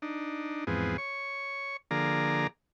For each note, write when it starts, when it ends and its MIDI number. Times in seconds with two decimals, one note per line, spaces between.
0.02 0.64 62
0.02 0.64 63
0.67 0.97 40
0.67 0.97 44
0.67 0.97 53
0.67 0.97 59
0.67 0.97 60
0.67 0.97 68
0.98 1.77 73
0.98 1.77 85
1.91 2.47 50
1.91 2.47 53
1.91 2.47 58
1.91 2.47 68
1.91 2.47 74
1.91 2.47 82